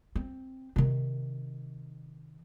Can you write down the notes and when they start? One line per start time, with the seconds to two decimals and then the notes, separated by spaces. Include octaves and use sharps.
0.16 C4
0.76 C3 D#3